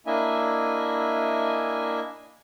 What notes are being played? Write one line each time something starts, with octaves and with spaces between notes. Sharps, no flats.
A#3 D4 E4 D#5 E5 G#5